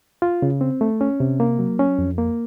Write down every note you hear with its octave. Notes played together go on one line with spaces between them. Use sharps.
F4
C#3
C4
A3
C#4
C3
A#3
F#3
C#4
F2
A#3